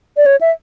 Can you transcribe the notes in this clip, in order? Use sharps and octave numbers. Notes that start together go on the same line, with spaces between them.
D5
C#5
E5